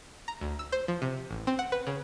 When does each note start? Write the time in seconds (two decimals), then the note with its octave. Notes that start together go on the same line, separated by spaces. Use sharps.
0.28 A#5
0.41 D2
0.59 E6
0.72 C5
0.88 F3
1.02 C3
1.31 A1
1.47 C4
1.59 F#5
1.72 B4
1.87 C#3